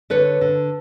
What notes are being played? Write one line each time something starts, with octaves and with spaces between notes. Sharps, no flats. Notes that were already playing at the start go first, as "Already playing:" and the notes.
D3 B4 C#5
D3